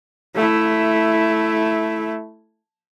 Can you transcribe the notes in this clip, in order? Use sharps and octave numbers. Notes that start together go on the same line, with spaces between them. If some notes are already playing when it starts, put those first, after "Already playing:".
A3 E4